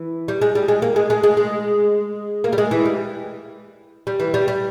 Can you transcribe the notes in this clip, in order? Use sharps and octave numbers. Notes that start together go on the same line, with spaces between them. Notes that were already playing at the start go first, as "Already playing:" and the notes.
Already playing: E3
G3
G#3
G3
G#3
A#3
G#3
G#3
G#3
G#3
A#3
G3
G#3
E3
G3
G3
E3
G3
G3